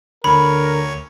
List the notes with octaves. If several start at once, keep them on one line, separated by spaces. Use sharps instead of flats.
D2 D3 A#4 C#5 B5